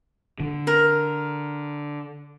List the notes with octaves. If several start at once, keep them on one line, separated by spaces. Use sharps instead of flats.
D3
A#4